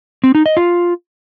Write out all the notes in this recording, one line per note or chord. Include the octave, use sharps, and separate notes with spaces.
C4
D#4
D#5
F4